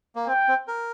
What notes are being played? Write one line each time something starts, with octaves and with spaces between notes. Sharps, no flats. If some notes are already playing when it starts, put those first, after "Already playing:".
A#3
C4 G5
C4
A#4